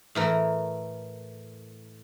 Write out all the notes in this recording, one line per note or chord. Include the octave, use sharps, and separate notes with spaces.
A2 E3 A#4